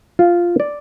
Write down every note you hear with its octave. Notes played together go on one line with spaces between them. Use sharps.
F4
D5